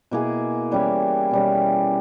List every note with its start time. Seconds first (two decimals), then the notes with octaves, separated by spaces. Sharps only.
0.11 B2 A#3 E4 G#4
0.71 E3 G3 C#4 E4
1.31 B2 G3 C#4